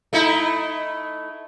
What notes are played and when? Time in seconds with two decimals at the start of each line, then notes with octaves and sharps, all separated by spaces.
0.13 A3 D#4 E4